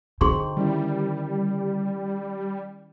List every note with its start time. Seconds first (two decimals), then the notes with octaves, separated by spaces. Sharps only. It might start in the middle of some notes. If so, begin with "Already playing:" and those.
0.21 D3 C4 D#4 G#4 C5 C6 C#6
0.57 D#3 G3 C#4 E4